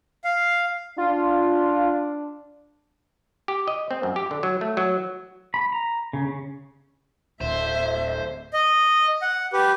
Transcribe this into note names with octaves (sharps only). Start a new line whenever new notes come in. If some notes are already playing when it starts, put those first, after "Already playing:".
F5
D4 F4
G4
D#5
C4
F#2
G4
D3
F#3
A3
F#3
B5
A#5
C#3
C#3
D1 C5 E5
D#5
F#5
G4 B4